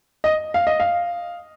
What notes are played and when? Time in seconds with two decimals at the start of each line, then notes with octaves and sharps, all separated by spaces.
0.24 D#5
0.54 F5
0.67 D#5
0.80 F5